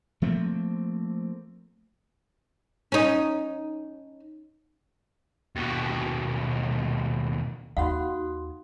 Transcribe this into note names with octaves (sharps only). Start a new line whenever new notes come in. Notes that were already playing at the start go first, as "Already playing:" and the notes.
F3 A3 A#3 C4
C#4 D#4
D#2 B2
D#2 D#4 F#4 F5 F#5 B5 C6